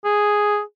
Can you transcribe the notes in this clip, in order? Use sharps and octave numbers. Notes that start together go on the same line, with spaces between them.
G#4